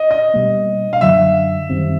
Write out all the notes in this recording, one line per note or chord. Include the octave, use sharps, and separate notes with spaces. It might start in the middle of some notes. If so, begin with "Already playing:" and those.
Already playing: D#5
D#5
B2 G3 A#3
F5
F#2 D3 F#3 E5
F#2 D#3 G3 C4